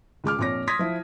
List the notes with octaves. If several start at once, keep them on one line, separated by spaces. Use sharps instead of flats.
C#2 G#3 D6 F6
A#1 F2 C#5 D6 A#6
C6 D#6 G#6 A#6 B6
F3 E4